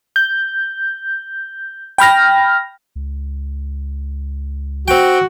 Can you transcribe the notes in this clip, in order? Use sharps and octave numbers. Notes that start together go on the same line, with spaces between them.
G6
G5 B5 F6 A#6
C#2
C4 F#4 G5